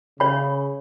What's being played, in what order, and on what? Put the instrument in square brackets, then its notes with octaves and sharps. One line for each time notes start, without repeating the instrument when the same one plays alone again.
[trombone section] C#3 [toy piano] C#5 B5